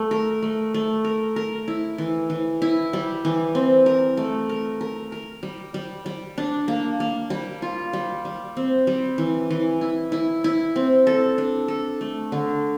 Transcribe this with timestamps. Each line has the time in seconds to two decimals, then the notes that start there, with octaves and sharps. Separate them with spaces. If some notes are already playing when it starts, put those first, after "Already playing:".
Already playing: A3
0.11 A#4
0.42 A3
0.74 A3
1.05 A#4
1.36 A#4
1.68 E4
1.98 E3
2.30 E3
2.62 E4
2.93 G3
3.25 E3
3.55 C4
3.86 A#4
4.17 A3
4.49 A#4
4.81 A#4
5.12 A#4
5.43 G3
5.74 G3
6.06 G3
6.38 D4
6.68 A#3
7.00 A#3
7.30 G3
7.62 F4
7.93 G3
8.25 G3
8.57 C4
8.87 G3
9.18 E3
9.51 E3
9.81 E4
10.12 E4
10.44 E4
10.76 C4
11.07 A4
11.38 D4
11.68 A4
12.01 A3
12.32 D3